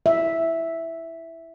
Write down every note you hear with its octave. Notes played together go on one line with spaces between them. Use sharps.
E5